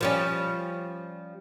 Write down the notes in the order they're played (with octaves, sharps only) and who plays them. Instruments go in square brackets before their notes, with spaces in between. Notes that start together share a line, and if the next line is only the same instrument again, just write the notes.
[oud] F3 G3 C#4